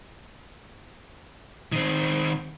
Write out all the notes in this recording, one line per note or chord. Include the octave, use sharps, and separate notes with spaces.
D#3 C4